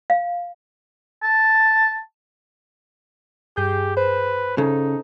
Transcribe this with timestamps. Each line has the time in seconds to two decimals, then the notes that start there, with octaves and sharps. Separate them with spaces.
0.10 F5
1.23 A5
3.57 G2 G4 G#4 G6
3.97 B4 C5
4.58 C#3 D#4 A4